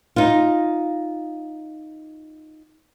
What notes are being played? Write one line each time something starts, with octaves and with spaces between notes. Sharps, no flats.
D#4 F4